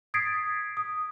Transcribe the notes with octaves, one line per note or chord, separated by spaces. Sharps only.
D#6 G#6 A6 B6 C7 D7
D#6